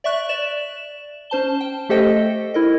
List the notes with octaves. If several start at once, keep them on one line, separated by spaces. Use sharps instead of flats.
D5 E5 C#6 F#6
D5 E7
C#4 C5 A5 G7
G5
A3 G4 A4 C5 D#5 G5
E4 A#4 D#5